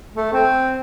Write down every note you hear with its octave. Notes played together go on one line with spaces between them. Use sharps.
A3
C4